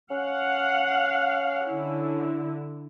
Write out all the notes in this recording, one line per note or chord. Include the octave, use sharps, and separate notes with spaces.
C#4 F5 F#5
D3 E4